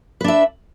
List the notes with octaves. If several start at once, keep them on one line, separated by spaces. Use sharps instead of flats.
D4 B4 E5